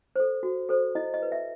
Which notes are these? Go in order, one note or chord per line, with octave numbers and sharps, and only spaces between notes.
A4 C5
F#4
A4 C5
E4 D#5
D#5
B4
E5